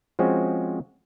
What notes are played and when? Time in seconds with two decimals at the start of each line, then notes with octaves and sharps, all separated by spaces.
0.19 F3 G#3 C4 C#4 F#4